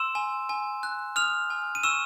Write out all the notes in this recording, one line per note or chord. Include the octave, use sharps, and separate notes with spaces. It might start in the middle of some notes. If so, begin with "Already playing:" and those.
Already playing: C6 E6 E7
G#5
G#5
F#6
D#6 F6 F7
G#5
D#7
C#6 E6 E7